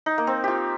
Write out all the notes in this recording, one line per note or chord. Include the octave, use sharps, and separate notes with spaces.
D#4
A#3
C4
F4 G4